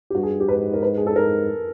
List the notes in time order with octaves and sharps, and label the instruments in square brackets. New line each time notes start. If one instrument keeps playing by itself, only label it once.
[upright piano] G4
[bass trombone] G2 [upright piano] F#4
[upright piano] G#4
G4
[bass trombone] G#2 [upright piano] B4
[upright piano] A#4
B4
G#4
A4
[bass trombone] G#2 [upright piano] A#4